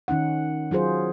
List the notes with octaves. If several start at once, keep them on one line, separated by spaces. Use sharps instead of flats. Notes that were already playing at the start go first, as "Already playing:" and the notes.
D#3 C#4 D#4 F#5
F#3 F4 G#4 C5